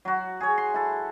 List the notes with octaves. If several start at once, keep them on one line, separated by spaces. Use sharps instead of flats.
F#3 F#4
G#4 C#5
C6
E4 A4